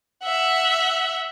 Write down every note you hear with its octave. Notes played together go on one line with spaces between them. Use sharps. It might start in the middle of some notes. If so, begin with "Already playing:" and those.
E5 F#5